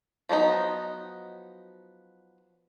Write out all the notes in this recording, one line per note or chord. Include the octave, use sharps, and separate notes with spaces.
F3 F#3 B3 D#4